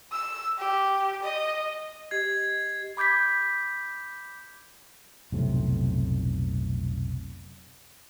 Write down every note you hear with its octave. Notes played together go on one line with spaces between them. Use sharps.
E6
G4
D#5
G4 D#5 G#6 C7
B5 D6 G6 G#6 B6
F1 B1 A2 C3